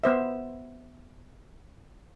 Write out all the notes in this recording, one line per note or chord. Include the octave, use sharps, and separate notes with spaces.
B3 C5 E5